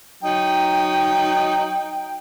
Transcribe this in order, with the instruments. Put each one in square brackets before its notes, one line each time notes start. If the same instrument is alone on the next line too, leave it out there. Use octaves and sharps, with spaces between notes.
[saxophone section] F#3 D#4 [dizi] G5